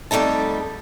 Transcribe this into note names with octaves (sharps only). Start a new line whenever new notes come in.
F2 G3 A3 D#4 A5